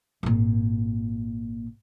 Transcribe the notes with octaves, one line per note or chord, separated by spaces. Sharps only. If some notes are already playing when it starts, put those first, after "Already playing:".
G#1 A#2